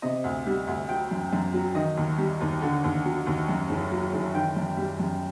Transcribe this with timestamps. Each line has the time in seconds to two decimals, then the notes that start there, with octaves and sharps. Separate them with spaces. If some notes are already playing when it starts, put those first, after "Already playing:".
0.02 C3 D#5
0.24 D2
0.46 G3
0.67 D2
0.89 F#3 G5
1.11 F#2
1.33 F#2
1.54 F#3
1.75 D#3 D#5
1.97 D#2
2.18 G3
2.41 D#2
2.62 D3
2.84 D#2
3.05 F#3
3.27 D#2
3.49 F#2
3.70 F#1
3.91 F#3
4.13 F#1
4.34 D#3 G5
4.56 F#2
4.77 G3
4.99 F#2